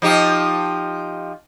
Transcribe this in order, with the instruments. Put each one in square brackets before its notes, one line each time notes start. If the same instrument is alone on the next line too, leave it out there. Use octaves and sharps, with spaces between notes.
[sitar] F3 D#4 G4